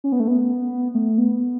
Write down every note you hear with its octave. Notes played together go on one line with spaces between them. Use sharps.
C#4
B3
A3
B3
A3
B3